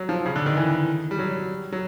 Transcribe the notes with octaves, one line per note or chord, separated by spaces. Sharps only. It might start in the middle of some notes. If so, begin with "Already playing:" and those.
Already playing: F#3
F3
C#3
D3
D#3
E3
G3
F#3
F#3